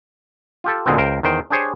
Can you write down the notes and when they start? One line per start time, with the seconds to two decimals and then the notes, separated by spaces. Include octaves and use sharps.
0.64 F4 G4 A4
0.86 D2 A#2 D3 G#3 B3 C4
0.98 C#2 A#4 C5 G5
1.23 E2 D#3 C5 G5
1.50 D4 G4 G#4 C5 C#5